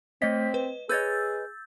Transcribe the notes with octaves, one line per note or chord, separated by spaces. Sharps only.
A3 C4 C#5 D#5 B6
B4
G#4 B4 C#5 D#5 E6 G6 A6